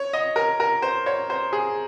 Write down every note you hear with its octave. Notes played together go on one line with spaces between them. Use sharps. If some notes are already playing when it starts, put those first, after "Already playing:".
Already playing: C#5
D#5
A#4
A#4
C5
C#5
C5
G#4